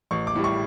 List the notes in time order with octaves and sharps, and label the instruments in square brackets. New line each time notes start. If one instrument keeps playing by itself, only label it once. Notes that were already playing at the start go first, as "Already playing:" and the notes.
[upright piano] A1 C#6
D6
A2 G3
C#6